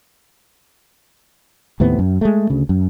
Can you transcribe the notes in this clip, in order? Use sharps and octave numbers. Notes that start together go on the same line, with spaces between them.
D#2 A2 C3 B3
F#2
G#3 A3
D2 C#3
F#2